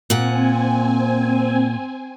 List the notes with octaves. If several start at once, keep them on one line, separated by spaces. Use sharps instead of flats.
A#2 C4 F#5 G#5